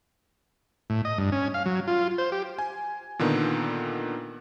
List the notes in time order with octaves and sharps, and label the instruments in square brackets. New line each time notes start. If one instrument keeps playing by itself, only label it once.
[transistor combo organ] A2
D#5
G2
C#4
F5
F#3
F4
C5
G4
[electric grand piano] G#5
A#2 D3 D#3 B3